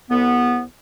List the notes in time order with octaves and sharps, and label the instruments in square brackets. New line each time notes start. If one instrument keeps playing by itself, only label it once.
[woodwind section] C2 B3